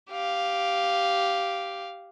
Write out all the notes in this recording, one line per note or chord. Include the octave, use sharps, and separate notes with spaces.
G4 F5